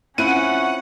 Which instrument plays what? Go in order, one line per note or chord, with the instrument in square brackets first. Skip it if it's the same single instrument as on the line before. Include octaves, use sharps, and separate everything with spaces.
[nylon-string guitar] C4 E4 F4 [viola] C#4 [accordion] F#5 [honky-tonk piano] D#7